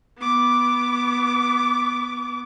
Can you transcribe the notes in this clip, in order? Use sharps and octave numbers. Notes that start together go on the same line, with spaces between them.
B3 D6